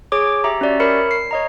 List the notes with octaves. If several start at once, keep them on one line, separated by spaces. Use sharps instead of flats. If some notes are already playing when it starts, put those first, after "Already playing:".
G#4 C#5 D6
G4 E5 A#5
C#4 F#4 G4 D5 E5
A#4 C#5 B5 C#7
C7
C#5 D#5 A#5